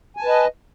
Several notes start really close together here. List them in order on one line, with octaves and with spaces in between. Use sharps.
G#5 A5 B4 D#5